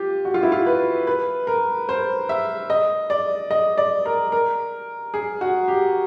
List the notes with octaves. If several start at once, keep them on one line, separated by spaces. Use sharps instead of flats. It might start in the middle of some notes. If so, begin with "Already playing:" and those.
Already playing: F4 G4
F#4
F4
E4
F4
B4
B4
A#4
C5
E5
D#5
D5
D#5
D5
A#4
A#4
G#4
F#4
G4